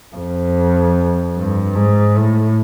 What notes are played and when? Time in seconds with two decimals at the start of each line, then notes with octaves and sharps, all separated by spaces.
0.16 F2
1.37 G2
1.76 G#2
2.16 A2